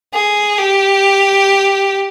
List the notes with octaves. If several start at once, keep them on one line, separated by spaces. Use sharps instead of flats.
G#4
G4